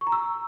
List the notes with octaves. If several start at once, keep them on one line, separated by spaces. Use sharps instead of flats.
C#6
A#5
E6